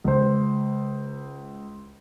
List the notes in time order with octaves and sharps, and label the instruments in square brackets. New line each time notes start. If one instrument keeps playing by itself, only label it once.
[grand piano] C#2 C5